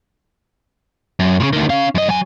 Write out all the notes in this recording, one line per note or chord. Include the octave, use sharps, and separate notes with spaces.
F#2
A#2 C#3
D2 D#3
C#4 F5
F#2 D#5
F#3 G#5